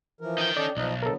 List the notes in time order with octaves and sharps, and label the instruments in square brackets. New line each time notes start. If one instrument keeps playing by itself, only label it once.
[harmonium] E3 F3 A#4
[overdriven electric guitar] D#4 G5
[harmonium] C#4 A4 D#5 [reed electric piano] D5
[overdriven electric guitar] B1 [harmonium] F3 D#4 D#5
[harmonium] D3 F#3 B3 [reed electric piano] A4 A#4